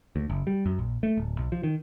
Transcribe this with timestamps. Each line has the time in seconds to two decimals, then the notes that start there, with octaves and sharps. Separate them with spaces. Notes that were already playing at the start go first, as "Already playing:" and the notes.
0.16 D2
0.30 F#1
0.47 G3
0.66 F#2
0.79 A#1
1.03 A3
1.17 D1
1.38 B1
1.52 F3
1.63 D#3